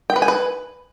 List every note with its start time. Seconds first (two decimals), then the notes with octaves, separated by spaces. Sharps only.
0.10 G5
0.16 B4
0.22 G#5
0.28 B4